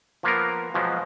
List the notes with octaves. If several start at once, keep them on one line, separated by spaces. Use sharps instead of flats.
F3 A#3 B3 A#4
B2 F3 F#3 G#3